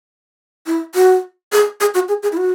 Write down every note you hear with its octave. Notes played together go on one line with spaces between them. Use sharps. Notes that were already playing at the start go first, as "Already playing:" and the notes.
E4
F#4
G#4
G#4
F#4
G#4
G#4
E4
F#4